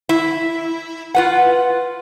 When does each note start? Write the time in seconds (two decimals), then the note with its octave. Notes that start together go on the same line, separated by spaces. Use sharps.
0.09 E4
1.15 F4 B4 F#5